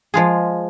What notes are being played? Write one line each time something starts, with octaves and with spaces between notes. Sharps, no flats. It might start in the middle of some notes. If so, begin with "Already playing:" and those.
F3 G#3 F4 G#4